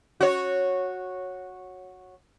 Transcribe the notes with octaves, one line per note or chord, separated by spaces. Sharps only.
F#4 C#5